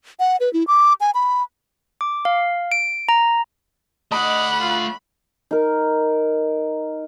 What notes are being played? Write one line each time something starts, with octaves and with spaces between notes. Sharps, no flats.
F#5
B4
E4
D6
G#5
B5
D6
F5
D7
A#5
A3 D5 D#5 F#5 B5
F4
D#4 A#4